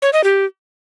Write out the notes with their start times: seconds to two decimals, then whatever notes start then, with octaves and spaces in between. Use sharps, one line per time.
0.02 C#5
0.13 D#5
0.24 G4